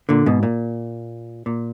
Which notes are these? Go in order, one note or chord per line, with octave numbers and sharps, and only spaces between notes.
A#2 D3
G#2 B2
A#2
A#2